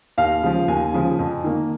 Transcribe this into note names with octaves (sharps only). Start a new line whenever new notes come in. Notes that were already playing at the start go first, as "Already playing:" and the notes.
D#2 F5
C#3 F3
D#2 G#5
C#3 F3
F2
D#3 A#3